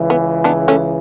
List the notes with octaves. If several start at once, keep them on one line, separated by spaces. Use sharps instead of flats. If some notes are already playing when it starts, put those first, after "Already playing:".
Already playing: C#2 C#3 E3
B3
B3 D4
A3 C#4